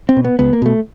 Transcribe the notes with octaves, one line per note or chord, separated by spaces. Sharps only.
C4
B2
B3
C#2 B3
A#3
B2 A3